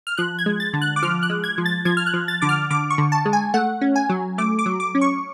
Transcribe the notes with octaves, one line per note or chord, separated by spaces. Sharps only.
F6
F3 F#6
G#6
G#3
A6
D3
F#6
D6
F3 F6
F#6
G#3
G#6
F3
A6
F3 G#6
F6
F#6
F3
A6
D3 D6
F6
D3 D6
C#6
D3
A5
G#3
G#5
A3 F#5
C#4
G#5
F#3
A3 D6
D6
F#3
D6
C#4
C#6